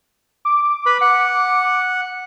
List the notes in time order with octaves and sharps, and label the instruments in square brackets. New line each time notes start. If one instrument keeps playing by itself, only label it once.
[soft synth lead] D6
[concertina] B4 B5
F#5